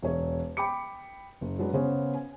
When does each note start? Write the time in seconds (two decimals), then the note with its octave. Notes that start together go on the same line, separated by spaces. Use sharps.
0.02 E1 C#5
0.57 G5 B5 D6 C#7
1.41 F#1
1.59 F#3 G#3 D4 B4
1.73 C#3 B3 C#4 C5 C#5
2.14 G#5